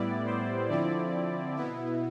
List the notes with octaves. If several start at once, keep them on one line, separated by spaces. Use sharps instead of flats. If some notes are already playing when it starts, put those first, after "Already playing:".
Already playing: A2 G3 B3 E4 D5
C5
D3 F3 C4 E4 D5
B2 B3 E4